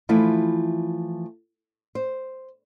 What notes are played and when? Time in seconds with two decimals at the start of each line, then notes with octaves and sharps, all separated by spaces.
0.09 E3 F3 A3 E4 F4
1.95 C5